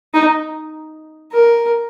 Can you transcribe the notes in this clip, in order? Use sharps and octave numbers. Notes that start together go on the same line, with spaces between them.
D#4
A#4